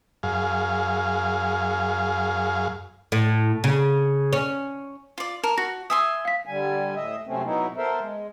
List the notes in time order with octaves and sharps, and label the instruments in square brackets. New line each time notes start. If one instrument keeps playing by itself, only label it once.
[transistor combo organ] F#2 G#4 F5
[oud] A2
C#3
C#4
[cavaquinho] F4 D5
[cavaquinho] A#4 [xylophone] A5
[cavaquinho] F#4 [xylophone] A#6
[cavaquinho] E5 G#5 C6 [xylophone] D#6 E6
[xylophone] F5 B6
[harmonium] D3 G3 G#5
A2 D#5 E5
F#2 C3 A3 C4 C#4
B2 F#3 B3 D#4 E4
B3 A4 A#4 C5 E5
G#3